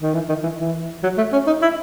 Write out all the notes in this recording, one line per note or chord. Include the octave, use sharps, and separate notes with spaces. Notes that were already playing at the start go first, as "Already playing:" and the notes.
D#3
E3
D#3
E3
E3
F#3
A3
C#4
D#4
E4